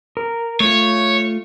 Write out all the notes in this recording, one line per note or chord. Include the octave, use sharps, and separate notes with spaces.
A#4
A3 F4 C#5